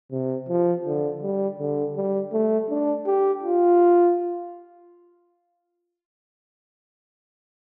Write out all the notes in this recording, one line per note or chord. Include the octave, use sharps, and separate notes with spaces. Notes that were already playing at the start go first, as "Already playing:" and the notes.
C3
F3
D3
G3
D3
G3
A3
D4
G4
F4